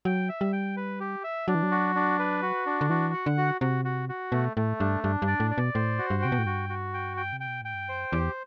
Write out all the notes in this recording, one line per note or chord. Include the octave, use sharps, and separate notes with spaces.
F#3 G5
E5
G3
G5
B4
G4
E5
F#3 D4
E3
F#3
F#4
D4
B4
F#4
D4
D3
E3 F#4
F#5
D3
F#4
C3 F#4
F#4
F#4
B2 A3
A2 A3
G2 D4
G2 D4
G2
D5
A2
D5
B2
A2 C5
F#4
G2
C3 G5
B2
A2
G2 F#4
F#4
G5
G5
C3
G5
B2
A2 G5
G2
F#2 C5
E2 G4